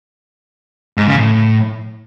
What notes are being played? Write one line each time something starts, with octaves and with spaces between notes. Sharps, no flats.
G#2
C#3
A2